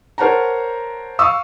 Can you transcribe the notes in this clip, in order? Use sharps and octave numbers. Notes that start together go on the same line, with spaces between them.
A#4 C5 C#5 F#5 A5 A#5
F5 C#6 D#6 E6